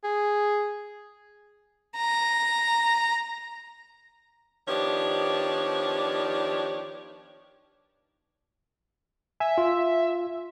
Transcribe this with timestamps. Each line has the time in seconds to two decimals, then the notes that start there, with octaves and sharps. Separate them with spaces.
0.04 G#4
1.97 A#5
4.67 D#3 F3 B3 D4 G4 C#5
9.40 E5 G#5
9.58 F4